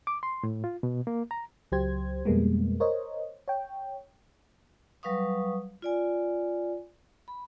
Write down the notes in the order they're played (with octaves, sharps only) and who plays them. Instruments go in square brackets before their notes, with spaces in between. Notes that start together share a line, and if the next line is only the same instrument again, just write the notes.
[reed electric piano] D6
C6
A2
F4
B2
A#3
A#5
[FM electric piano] C#2 F#3 G4 C5 G#6
F2 B2 G3 G#3 A#3 B3
A#4 C5 C#5 D#5
C#5 G5
[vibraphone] F#3 G3 B4 F5 C#6 D#6
F4 D5 G#5
B5